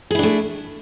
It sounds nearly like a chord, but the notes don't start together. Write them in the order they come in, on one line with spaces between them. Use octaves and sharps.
G#4 E4 D4 A3